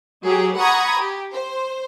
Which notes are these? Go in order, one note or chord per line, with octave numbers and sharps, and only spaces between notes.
F#3 G4 G#4
F#5 A#5 B5 C#6 D#6 G#6
G4
C5